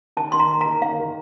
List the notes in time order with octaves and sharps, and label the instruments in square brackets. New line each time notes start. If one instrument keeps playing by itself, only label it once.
[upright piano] D#3 [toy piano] A5
[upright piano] D#3 [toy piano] C6
[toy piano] A#5
[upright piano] A#3
[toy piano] A#5
[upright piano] D#3
[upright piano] D#3 [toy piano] F5
[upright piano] D#3